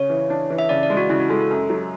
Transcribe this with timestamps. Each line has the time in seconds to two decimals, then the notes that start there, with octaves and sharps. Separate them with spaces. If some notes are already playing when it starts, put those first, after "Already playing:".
Already playing: C#3 C#5
0.10 E3
0.30 D4
0.50 E3
0.59 E5
0.69 C#3 D5
0.83 D5
0.90 G#3
0.97 F#4
1.09 C#3 E4
1.20 F#4
1.29 G#3 A4
1.41 A4
1.51 F#2
1.70 F#3